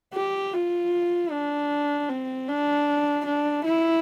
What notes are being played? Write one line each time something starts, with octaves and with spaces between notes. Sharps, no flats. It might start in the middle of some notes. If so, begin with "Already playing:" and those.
G4
F4
D4
C4
D4
D4
E4